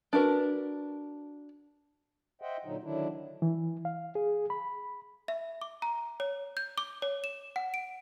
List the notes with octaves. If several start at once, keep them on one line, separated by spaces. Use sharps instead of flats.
D4 F#4 A#4 B4
C5 D#5 E5 F#5 G5
A#2 D3 F#3 D#4
D3 D#3 F#3 D4 E4
E3
F5
G#4
B5
E5
D6
A#5
C#5
G6
D6
C#5
E7
F#5
D7